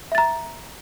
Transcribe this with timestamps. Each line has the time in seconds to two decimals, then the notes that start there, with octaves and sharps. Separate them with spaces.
0.12 E5
0.15 A6
0.18 A#5